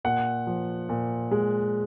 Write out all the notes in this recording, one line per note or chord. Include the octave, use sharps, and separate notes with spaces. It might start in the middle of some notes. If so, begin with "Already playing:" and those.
A#2 F#5
F3
A#2
G#3